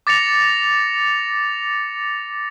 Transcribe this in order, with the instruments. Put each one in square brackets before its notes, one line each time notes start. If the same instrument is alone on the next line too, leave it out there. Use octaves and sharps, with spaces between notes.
[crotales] D6 A6 A#6 C#7 F7